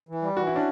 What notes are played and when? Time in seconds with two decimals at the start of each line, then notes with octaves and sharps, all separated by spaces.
0.09 E3
0.22 G3
0.37 E3 F#4
0.47 E4
0.51 C#4 D4